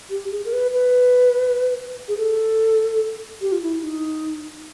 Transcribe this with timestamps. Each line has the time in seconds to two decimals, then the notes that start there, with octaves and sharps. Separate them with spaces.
0.10 G4
0.31 G#4
0.45 A#4
0.53 B4
0.73 B4
2.08 G#4
2.17 A4
3.41 G4
3.52 F4
3.62 E4
3.82 D#4